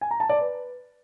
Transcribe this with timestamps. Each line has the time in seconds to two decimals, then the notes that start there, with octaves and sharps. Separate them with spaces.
0.01 G#5
0.11 A#5
0.20 A5
0.29 D5
0.39 B4